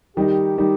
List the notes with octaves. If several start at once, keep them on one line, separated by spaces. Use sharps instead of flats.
D#3 G3 D#4 G4
D#3 G3 D#4